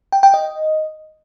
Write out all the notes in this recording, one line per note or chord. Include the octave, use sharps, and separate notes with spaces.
G5
G5
D#5